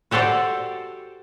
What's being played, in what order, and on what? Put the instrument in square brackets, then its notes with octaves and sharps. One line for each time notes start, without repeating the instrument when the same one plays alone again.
[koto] F#4 G4 A4 C5 D5